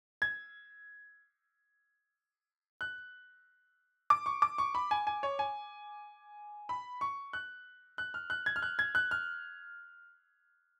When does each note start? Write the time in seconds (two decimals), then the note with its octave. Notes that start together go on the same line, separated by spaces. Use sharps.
0.22 G#6
2.81 F#6
4.10 D6
4.26 C#6
4.42 D6
4.58 C#6
4.75 B5
4.91 G#5
5.07 G#5
5.23 C#5
5.39 G#5
6.69 B5
7.01 C#6
7.33 F#6
7.98 F#6
8.14 F6
8.30 F#6
8.46 G#6
8.56 F6
8.62 F#6
8.79 G#6
8.95 F#6
9.11 F6